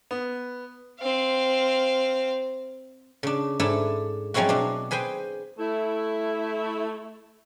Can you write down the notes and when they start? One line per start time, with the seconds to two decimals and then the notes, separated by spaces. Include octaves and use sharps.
0.11 B3
1.00 C4 F5
3.23 C#3 D4
3.60 G#2 D4 E4 A4 A5
4.34 F3 F#3 G#3 C4 E4 F#4
4.49 B2 D4
4.91 G#4 B4 C5 G5 G#5
5.58 A3 E4